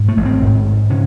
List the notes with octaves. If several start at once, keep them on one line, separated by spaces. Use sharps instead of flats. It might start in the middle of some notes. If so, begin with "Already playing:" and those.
Already playing: G#2
A3
A1
C4
G#2
G#2
C#3 C#4